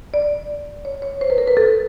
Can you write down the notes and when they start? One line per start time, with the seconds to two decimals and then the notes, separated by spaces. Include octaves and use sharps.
0.14 D5
0.85 C#5
1.02 C#5
1.21 C5
1.30 B4
1.38 A#4
1.48 B4
1.57 A4